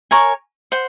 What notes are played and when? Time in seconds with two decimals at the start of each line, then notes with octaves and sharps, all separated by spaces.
0.11 A#4 C#5 G#5 C#6
0.72 C5 F#5